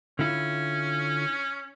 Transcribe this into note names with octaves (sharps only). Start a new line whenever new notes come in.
D3 C#4 E4 F4